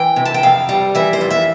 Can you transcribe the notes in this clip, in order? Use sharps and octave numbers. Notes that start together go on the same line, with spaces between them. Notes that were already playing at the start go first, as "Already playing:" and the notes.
Already playing: E3 G5
C3
A5
G5
F2 F5
G3
E3 E5
C5
F2
E5